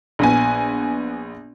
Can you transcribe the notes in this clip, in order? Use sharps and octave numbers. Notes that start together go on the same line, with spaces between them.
A#1 B3 G#5